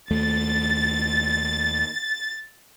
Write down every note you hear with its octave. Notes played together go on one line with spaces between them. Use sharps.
D#2 A3 A6